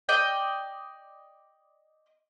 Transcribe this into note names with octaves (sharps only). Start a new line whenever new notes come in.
D5 D#5 G5